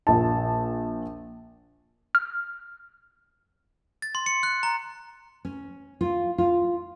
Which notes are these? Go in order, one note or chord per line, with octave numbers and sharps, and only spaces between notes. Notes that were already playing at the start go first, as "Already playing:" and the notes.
A#1 A5
F6
A6
C6
C#7
F#6
A#5
C#4
F4
F4